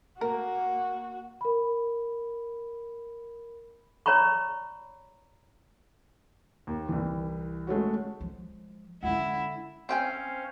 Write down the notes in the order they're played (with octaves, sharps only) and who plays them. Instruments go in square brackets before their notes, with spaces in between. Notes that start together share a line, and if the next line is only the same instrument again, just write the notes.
[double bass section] A#3 [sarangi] F#4 [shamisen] A#4
[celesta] A#4 B5
[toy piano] C#5 D5 A#5 B5 C#6
[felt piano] D#2
C2 E3
G#3 A3 C#4 F#4
[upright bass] F3 G#3
[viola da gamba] D3 E4 [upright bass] G#3 C#4 [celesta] F#5
[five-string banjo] C4 G5 G#5 [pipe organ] C#4 C5 F5